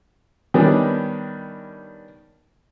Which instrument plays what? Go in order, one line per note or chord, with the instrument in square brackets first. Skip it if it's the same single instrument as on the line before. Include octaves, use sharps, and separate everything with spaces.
[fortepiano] D#3 G3 B3 C#4 D4